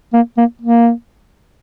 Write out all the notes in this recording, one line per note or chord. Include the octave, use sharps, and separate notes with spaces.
A#3
A#3
A#3